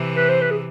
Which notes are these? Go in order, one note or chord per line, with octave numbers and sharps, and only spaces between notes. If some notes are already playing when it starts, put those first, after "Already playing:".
Already playing: C3 E3
B4
C5
B4
G#4